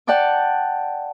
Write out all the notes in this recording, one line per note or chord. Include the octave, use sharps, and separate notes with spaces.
D5 F#5 G5 A5 D6